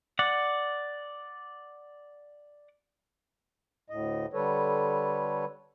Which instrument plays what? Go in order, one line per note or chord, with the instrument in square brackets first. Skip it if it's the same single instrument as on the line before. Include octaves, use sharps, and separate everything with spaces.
[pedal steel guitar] D5 F#5
[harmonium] D2 A2 D#5
D3 G3 A4 B4 C#5